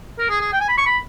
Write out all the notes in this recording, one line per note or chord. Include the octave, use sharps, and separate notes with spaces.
A#4
G#4
G#4
G5
G#5
B5
C#6
B5